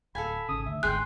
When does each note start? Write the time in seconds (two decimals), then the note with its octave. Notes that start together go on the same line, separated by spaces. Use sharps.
0.15 D1 A4 F5 G#5 B5
0.49 G#1 C#3 D#6
0.66 D2 E5
0.83 G1 D2 G#2 G#4 G5 C6 F#6